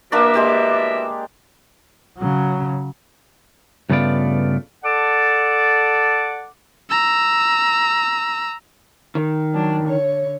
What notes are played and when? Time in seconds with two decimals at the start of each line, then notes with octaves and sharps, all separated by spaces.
0.12 B2 E3 A#3 D4 D5 E5
0.34 G#3 G4 F5
2.18 C#3 F#3
3.90 G2 C#3 A3 B3 F4 D5
4.83 A4 D5 F#5 A5 D6
6.89 A#5 E6
9.15 D#3
9.53 F#3 D4
9.84 D3 C#5